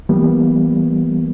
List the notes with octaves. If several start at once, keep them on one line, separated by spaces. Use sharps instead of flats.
E3 G3 A#3 B3